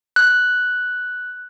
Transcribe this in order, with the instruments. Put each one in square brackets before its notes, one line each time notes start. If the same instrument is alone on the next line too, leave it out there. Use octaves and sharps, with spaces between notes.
[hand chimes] F#6